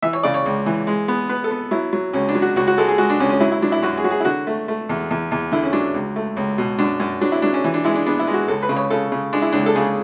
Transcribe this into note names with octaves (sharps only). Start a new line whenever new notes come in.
E3 E5
C#5
C#3 D5
C#5
C#2
E3
G#3
B3
B3 B4
A4
B3
F#3 E4
F#3
C#2 C#4
D4
F#3
F#4
C#2 F#4
F#4
G#3 A4
G#4
G#3 F#4
D4
C#2 C#4
C#4
F#3 E4
E4
F#3 D4
E4
F#2 F#4
G#4
F#3 F#4
G#4
E4
D3 F#4
A3
A3
E2
E2
E2
D3 E4
C#4
F#3 D4
C#2
A3
C#2
B2
F#2 D4
F#2
F#3 D4
E4
F#3 D4
C#4
E3
D4
G#3 E4
D4
B3 D4
E4
G#3
F#4
C#2 A4
B4
C#3
C#5
C#3 A4
C#3
G#3 D4
E4
C#2 D4
A4
C#3 G#4